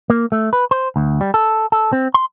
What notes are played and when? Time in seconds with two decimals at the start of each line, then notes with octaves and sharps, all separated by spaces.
0.10 A#3
0.32 A3
0.53 B4
0.71 C5
0.96 D2
1.21 G3
1.34 A4
1.72 A4
1.93 C4
2.14 C6